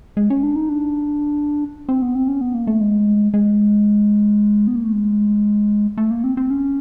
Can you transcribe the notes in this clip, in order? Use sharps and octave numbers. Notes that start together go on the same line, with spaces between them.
G#3
C#4
D4
D#4
D4
C4
B3
C4
C#4
B3
A#3
A3
G#3
G#3
B3
A#3
A3
G#3
A3
A#3
C4
C4
C#4